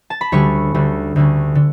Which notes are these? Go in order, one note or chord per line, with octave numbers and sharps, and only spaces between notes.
A5
B5
D2 D3 G3 C#4 C#5 C#6
D2 D3 G3 C#4
D2 D3 G3 C#4
D3